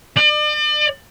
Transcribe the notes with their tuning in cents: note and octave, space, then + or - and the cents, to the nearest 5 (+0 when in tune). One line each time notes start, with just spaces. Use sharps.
D5 +40